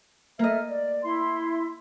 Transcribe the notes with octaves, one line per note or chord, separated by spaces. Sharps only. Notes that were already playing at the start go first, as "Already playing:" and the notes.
A#3 A4 D#5 E5 F6
D5
E4 C6